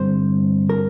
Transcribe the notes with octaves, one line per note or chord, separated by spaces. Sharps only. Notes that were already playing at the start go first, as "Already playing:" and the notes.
Already playing: G2 D3 G3 C4 C5
A#4